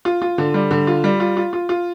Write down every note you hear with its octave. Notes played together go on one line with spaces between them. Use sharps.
F4
F4
D3
G3
D3
F4
G3
F4
F4
F4
F4